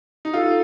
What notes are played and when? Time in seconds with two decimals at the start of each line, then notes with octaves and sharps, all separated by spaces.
0.25 D#4
0.33 F4 A4